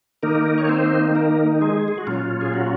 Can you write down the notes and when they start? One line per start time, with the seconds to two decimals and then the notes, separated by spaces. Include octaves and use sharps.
0.23 D#3 A#3 D#4 A#4
0.58 C#5
0.69 C4 C5
1.15 A#3 A#4
1.61 G#3 G#4
1.88 G#4
1.98 F#4
2.07 A#2 F#3 C#4 F4
2.41 G#4
2.54 F#4